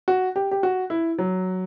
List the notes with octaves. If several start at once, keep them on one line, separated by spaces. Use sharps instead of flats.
F#4
G4
G4
F#4
E4
F#3